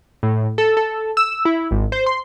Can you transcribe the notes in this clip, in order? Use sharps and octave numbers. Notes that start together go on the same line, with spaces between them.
A2
A4
A4
E6
E4
G#1
C5
C6